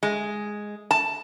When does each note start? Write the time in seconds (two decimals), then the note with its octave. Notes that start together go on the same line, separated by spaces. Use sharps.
0.03 G#3
0.91 A5